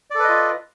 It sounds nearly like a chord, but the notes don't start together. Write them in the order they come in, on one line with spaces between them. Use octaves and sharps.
D5 A4 B4 D#5 F4